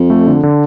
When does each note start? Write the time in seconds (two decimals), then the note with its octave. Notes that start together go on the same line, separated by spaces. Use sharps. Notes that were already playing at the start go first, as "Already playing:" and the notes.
Already playing: F2
0.10 A3
0.27 D3
0.43 D3